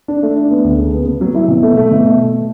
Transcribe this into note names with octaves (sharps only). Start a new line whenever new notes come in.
D4
A3
D4
B3
D2
C#3
B3
B3
F#3
E4
B2
A3
A3
B2